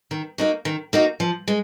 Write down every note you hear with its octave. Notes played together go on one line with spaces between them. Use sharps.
D#3
A#3 D#4 F#4
D#3
A#3 D#4 F#4
F3
G#3